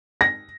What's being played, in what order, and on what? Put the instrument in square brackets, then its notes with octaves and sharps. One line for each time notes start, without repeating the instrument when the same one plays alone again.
[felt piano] A#6